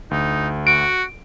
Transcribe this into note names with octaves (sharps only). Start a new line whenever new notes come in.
D2 D#4
F#4 D7